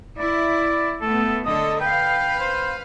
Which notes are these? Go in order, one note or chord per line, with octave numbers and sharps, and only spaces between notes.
E4 D5
A3 B3 A4
D3 A4 D#5
B4 F5 G5
C5